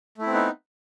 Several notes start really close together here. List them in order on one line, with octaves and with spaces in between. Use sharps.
A3 E4 C4 B3 D#4